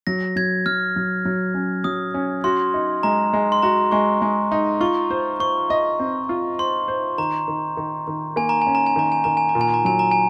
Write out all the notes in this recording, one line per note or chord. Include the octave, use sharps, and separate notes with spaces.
F#3 A#6
F#3 G#6
F#3 F6
F#3
F#3
C#4
F#3 D#6
C#4
F#4 C6
D#4
G#3 A#5
G#3
C6
F#4 A#5
G#3 C#6
G#3
D#4
F4 C#6
C5
C5 C#6
D#5
C4
F4
C5 C6
C5
D#3 A#5
D#3
D#3
D#3
A#3 G#5
A#5
G#5
C#4
A#5
G#5
D#3 A#5
G#5
D#3 A#5
G#5
A#5
A#2
G#5
A#5
F#3 G#5
A#5
G#5